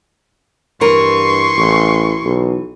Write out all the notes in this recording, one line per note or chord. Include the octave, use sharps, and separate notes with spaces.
G2 E3 A#4 C6 C#6
A1
B1